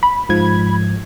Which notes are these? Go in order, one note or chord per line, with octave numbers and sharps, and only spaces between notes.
B5
G#2 F3 G#6